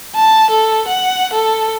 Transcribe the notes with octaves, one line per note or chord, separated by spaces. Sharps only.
A5
A4
F#5
A4